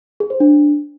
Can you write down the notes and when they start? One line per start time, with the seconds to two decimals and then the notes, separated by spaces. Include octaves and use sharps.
0.20 G#4
0.30 C5
0.40 D4